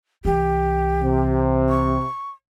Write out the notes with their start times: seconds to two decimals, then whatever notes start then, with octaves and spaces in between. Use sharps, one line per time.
0.25 C2 E3 G4
1.03 C3
1.69 C#6